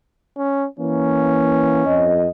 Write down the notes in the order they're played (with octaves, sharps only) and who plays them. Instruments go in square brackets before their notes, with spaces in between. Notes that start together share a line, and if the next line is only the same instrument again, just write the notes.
[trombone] C#4
[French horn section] E3 A#3 [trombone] C#4
[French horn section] F2 D#5